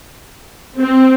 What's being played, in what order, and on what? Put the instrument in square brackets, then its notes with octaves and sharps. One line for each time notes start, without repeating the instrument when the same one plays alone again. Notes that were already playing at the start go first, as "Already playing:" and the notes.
[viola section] C4